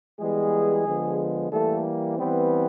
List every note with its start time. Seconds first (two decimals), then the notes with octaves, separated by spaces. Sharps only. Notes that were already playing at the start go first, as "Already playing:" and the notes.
0.19 E3 G3 G#3 B3 G#4
0.86 D3 F3 G#3 B3
1.52 E3 G3 A3 A#3 A4
2.18 E3 G3 B3 C4 B4